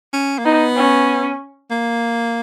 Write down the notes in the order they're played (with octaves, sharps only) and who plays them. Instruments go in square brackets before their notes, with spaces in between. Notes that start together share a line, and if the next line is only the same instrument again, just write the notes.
[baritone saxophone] C#4
A#3
[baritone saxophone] B3 [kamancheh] D#4
[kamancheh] C#4
[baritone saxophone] A#3